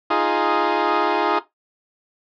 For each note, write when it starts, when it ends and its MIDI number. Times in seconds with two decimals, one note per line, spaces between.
0.10 1.38 63
0.10 1.38 65
0.10 1.38 68